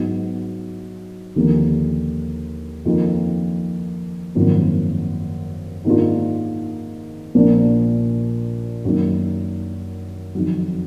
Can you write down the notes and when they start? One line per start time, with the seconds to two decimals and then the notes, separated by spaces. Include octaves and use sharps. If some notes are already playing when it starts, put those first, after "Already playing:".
Already playing: G#2 F#3 B3
1.36 D#2 D3 F3 A#3
2.85 F2 D#3 A#3 F4
4.35 G#1 F#2 F3 A#3 F4
5.85 G#2 D#3 A#3 D4 F4
7.35 A#1 A#2 F3 A#3 D4
8.85 F#2 D#3 A#3
10.35 F2 D#3 F#3